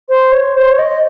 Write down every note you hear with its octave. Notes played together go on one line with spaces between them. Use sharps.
C5
C#5
C5
C#5
D#5